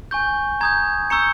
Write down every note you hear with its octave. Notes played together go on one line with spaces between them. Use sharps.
G#5 C#6 G6
A#5 D#6 G6 G#6
A#5 C#6 E6 G6 C#7